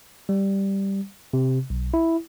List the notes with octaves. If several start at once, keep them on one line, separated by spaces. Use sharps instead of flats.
G3
C3
B1
E4